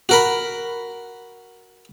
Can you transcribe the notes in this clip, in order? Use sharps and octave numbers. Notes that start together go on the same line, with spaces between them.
F#4 A#4 B5